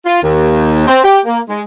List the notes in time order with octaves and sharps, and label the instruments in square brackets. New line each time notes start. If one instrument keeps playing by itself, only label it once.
[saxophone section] F4
D#2
C4
G4
A#3
G#3